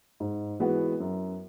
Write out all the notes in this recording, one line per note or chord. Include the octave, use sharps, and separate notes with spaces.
G#2
E3 G#3 B3 F#4
F#2